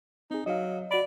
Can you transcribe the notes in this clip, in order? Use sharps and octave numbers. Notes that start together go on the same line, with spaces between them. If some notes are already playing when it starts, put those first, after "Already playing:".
C4 D#4 G#4
F#3 D#5 F5
F#4 D5 B5